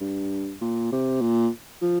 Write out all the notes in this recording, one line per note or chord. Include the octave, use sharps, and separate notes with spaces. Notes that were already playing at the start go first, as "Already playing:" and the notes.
G2
A#2
C3
A#2
F3